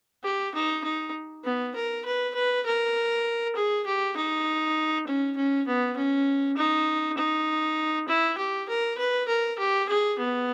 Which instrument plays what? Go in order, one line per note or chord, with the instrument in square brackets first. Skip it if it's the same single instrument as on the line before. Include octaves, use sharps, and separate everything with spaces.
[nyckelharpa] G4
D#4
D#4
B3
A#4
B4
B4
A#4
G#4
G4
D#4
C#4
C#4
B3
C#4
D#4
D#4
E4
G4
A#4
B4
A#4
G4
G#4
B3